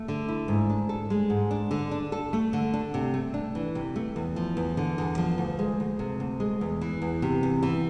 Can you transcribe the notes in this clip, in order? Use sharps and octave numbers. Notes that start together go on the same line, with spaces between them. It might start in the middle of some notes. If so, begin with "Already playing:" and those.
Already playing: A3
D3
E4
G#2
D4
A4
G#3
G#2
D4
D3
D4
A4
A3
D3
D4
C3
A3
D4
E3
C3
A3
E2
F3
E2
D3
E2
F3
D2
G#3
D2
C3
D2
G#3
E2
E3
E2
C3
E2
E3